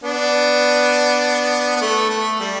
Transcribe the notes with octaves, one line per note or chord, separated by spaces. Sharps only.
B3 D4
B3
A3
A3
G3